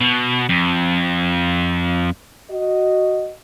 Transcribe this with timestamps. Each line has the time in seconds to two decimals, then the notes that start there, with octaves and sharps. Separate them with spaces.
0.01 B2
0.49 F2
2.50 F#4 D#5